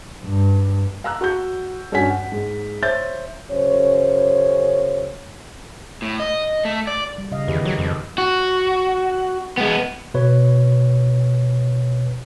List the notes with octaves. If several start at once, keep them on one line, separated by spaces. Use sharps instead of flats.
G2
F5 A#5 E6 F#6
F#4 C#6 G6
G2 C#4 F#4 F#5 G#5 B6
F#5
G#2
C5 C#5 E5 G6 A6
F#2 C#3 C5 C#5
A2
D#5
A3
D5
G3
C#3 D#5 F5
E2 D#3 G4 B4
F#3
F2
F#4
G#3 B3
B2 B4 C#5